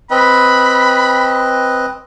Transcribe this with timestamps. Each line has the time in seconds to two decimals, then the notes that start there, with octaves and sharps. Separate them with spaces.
0.11 C4 B4 D#5 B5